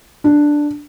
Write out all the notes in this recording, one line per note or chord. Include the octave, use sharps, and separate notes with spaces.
D4